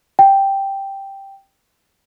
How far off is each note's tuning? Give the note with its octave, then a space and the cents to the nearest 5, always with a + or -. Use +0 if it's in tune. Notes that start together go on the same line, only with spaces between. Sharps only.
G5 +0